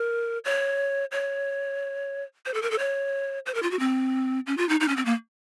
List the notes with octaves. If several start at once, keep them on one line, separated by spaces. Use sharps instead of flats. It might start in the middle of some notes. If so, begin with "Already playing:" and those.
Already playing: A#4
C#5
C#5
C5
A4
A#4
A4
C#5
C5
A#4
F4
F#4
C4
C#4
F4
D#4
D#4
C#4
C4
A#3